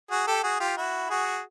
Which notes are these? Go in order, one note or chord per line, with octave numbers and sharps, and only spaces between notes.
F#4 G#4
G4 A4
F#4 G#4
F4 G4
E4 F#4
F#4 G#4